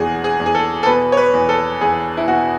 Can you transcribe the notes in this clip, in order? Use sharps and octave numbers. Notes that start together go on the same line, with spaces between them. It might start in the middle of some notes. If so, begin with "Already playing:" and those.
Already playing: E2 B2 F#4 G#4
G#4
E2
G#4
A4
A4
B2 B4
C#5
B4
E2
A4
E2 G#4
E4
B2 F#4